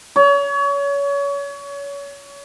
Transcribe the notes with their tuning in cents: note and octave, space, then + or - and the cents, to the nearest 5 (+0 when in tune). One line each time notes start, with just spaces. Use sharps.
C#5 +30